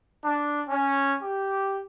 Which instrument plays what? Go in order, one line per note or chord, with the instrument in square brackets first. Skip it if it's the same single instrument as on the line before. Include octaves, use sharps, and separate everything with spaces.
[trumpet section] D4
C#4
G4